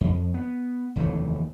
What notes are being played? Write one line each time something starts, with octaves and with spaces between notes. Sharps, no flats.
F2
B3
F1 D#2 E3 A3